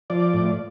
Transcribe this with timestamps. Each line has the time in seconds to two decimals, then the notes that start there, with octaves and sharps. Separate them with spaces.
0.10 F3 D5
0.33 A2